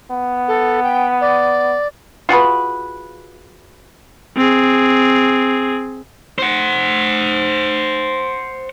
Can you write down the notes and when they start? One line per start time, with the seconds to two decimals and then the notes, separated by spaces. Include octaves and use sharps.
0.11 B3
0.48 A4
0.83 G5
1.21 D5
2.29 F4 F#4 G#4 B4
4.37 C4 G#4
6.39 C5 F#5